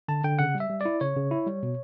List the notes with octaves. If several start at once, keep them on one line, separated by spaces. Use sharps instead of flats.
D3 A5
D3 G5
C#3 F#5
G3
E5
G3
E4 D5
C#3 C#5
C#3
E4
G3
B2